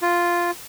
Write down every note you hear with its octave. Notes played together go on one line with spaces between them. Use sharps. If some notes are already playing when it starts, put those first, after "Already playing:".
F4